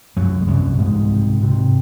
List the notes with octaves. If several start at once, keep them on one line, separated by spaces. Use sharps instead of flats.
C2 F#2 F#3
G#3
C2 F#2 F#3
G#2 C3 G#3
C3
C3